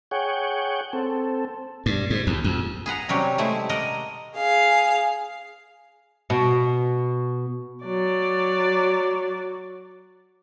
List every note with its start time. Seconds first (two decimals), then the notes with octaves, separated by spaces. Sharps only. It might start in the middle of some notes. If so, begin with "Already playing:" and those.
0.11 G#4 C#5 F#5 G5
0.93 C4 A4
1.86 G2
2.10 G#2
2.27 D#2
2.44 F2
2.86 G#4 B4 F#5 A#5
3.09 C3 F#3 G3 C#4 G4
3.38 G#3 A3 C4 E4
3.69 A#4 D5 D#5 F#5
4.37 G#4 F5
6.30 B2
7.84 F#3 D5